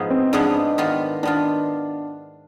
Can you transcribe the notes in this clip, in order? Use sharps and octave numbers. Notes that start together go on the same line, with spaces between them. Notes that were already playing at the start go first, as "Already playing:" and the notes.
Already playing: G#2 F3 B3 D#4 G#4
C4
G#2 F3 B3 D4 D#4 G#4
D#3 B3 F4
D#3 B3 D4 F4